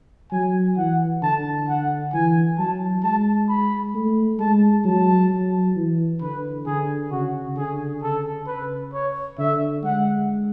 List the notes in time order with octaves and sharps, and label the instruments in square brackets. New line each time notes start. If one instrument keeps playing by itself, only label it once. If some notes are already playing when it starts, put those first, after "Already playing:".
[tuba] F#3 [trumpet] G#5
[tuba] E3 [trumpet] F#5
[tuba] D3 [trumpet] A5
[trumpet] F#5
[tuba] E3 [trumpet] G#5
[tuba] F#3 [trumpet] A5
[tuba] G#3 [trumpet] A5
[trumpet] B5
[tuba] A3
[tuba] G#3 [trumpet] A5
[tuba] F#3 [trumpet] A5
[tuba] F#3
E3
[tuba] D3 [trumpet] B4
[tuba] D3 [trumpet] G#4
[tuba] C#3 [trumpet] F#4
[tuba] D3 [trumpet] G#4
[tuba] C#3 [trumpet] A4
[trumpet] B4
C#5
[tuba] D3 [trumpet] E5
[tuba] G#3 [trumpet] F#5